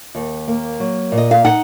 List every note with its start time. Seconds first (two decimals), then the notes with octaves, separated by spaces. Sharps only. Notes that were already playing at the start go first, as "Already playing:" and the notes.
0.15 D#2
0.48 A#3
0.80 F#3
1.12 A#2
1.18 D#5
1.31 F5
1.44 D#4 F#5